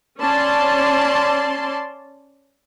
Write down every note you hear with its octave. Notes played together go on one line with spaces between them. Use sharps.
C#4 D5 A5 C6